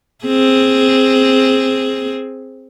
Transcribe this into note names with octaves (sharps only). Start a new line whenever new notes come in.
C4 G#4